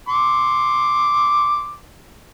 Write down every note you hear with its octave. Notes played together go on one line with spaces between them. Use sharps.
C6 D6